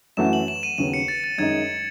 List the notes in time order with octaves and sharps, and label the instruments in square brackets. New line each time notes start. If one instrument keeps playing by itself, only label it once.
[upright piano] F#2 E3 A3 C#4 F#4 [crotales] E7
[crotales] F#7
E7
D#7
[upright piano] D#2 C#3 F#3 B3 [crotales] D#7
[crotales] C#7
A6
A6
[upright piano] F#2 D#3 G#3 D#4 [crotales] G#6